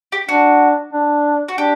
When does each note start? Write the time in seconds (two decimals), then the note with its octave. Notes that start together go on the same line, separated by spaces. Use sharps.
0.12 G4
0.29 D4 F#4
0.93 D4
1.49 F#4
1.58 D4 G4